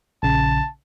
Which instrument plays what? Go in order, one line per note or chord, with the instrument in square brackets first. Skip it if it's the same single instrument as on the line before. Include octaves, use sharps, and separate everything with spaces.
[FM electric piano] A#1 C#3 [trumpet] A5